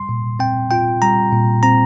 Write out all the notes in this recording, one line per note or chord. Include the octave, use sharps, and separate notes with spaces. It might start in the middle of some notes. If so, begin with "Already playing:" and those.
Already playing: G3 C6
A#2
C4 G5
F4 G5
G3 A#5
A#2
C4 A#5